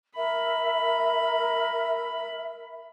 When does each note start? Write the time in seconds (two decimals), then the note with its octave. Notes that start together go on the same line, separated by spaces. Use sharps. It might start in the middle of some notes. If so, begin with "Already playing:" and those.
0.16 A#4 E5 B5